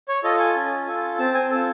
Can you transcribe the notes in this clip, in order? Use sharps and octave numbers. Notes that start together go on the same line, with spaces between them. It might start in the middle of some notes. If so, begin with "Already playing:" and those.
C#5
F4 A4 D#5
G#5
C#4
F4 A4
C4 A5
G#5
F4 A4 A5